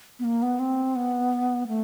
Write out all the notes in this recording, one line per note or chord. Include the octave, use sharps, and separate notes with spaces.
B3
A#3
B3
C4
B3
A3